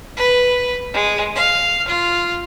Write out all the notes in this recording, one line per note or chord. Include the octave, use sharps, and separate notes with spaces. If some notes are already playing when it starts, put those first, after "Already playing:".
B4
G#3
F5
F4